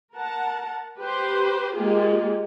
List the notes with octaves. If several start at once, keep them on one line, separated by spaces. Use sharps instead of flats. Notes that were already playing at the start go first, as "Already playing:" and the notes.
A#4 F#5 A5
G4 B4 C5
G#3 A#3 F4 G4 G#4